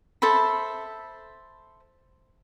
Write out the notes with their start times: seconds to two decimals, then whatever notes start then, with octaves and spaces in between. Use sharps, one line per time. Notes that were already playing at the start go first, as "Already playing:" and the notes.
0.22 A4 C5 E5 B5